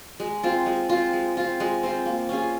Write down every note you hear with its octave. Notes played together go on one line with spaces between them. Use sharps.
G#3
C4 F4
G#3
C4 F4
G#3
C4 F4
G#3
C4 F4
A#3
C#4 F4 G#4